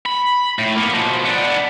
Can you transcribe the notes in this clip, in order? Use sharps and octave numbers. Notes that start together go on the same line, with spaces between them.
B5
A2
A#3 B3
B2 F3
B3 D4